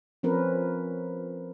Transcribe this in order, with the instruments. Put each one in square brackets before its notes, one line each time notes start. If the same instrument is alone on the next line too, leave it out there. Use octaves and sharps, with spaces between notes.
[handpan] F3 C4 C#4 A#4 B4